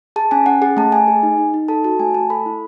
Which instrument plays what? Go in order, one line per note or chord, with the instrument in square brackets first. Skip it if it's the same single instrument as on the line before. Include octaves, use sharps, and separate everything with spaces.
[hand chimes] G#4 A5
C#4 G#5
C#4 F#5
G#4 F#5
A3 A5
A3 G#5
G#4
D#4
D#4
D#4
A4 A5
F#4 A5
A3 G#5
A3 A5
A4 B5
E4